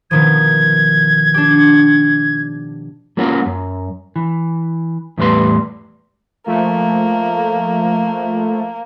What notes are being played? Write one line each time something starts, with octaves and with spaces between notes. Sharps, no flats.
B2 D#3 F3 G#6
D4 G4
F#3 A#3 C#4 F4 F#4
F#2
E3
E2 A2 G3 B4 C6
F3 A3 A#3